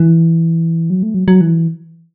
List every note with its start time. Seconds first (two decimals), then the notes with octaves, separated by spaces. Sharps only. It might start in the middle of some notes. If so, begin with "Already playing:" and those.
Already playing: E3
0.90 F#3
1.03 A3
1.14 F#3
1.28 F#3
1.41 E3